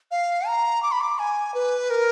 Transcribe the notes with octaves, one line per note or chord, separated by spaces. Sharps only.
F5
A#5
D6
B5
D6
G#5
B4
A#4